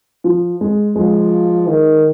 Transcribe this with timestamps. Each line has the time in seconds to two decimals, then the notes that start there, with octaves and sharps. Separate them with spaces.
0.24 F3
0.61 G#3
0.95 F3 G#3
1.68 D#3